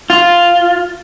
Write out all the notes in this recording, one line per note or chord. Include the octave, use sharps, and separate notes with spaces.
F4